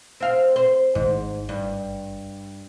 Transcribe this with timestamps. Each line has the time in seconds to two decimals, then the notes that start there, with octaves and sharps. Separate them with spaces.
0.20 C4 F5
0.56 C5
0.95 G#1 G#2
1.49 G2